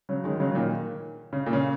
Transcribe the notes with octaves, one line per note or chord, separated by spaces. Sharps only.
C#3 F#3
D#3 G#3
G#3
C#3 F#3
F#3
A#2 D#3
C#3
A#2
C#3